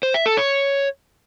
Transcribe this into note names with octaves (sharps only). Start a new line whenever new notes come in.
C5
E5
A4
C#5